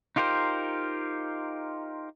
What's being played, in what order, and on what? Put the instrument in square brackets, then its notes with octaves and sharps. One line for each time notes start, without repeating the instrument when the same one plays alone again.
[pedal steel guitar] D#4 F4 G4 A#4 C5